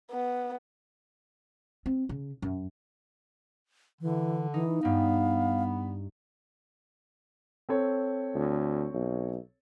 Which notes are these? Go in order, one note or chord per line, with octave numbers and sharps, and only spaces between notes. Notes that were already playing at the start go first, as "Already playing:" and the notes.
B3
C4
C#3
F#2
D3 E3
E3 D#4
G2 B3 D#4 F5
C4 A4 C#5
D2
B1